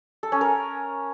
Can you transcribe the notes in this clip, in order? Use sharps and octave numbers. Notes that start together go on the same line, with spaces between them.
A4
C#4
A#4